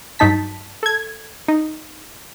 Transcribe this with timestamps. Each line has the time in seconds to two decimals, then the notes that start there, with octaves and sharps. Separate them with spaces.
0.19 G2 F#3 D#4 A5 B6
0.83 A4 G#6
1.48 D#4